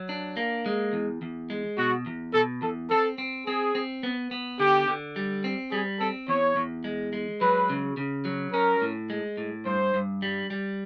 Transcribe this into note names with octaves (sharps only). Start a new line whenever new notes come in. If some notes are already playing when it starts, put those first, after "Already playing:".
Already playing: F#3
D4
A#3
G#3
E2
E2
G#3
B2 F#4
E2
B2 A4
E2 A4
C4 A4
C4
C4 G#4
C4
B3
B3
D3 G4
D3
G3
C4
G3 G#4
C4 A4
E2 C#5
E2
G#3
G#3
F#3 B4
C#3
C#3
F#3
C#4 A#4
A2
G#3
A2
G2 C5
G2
G3
G3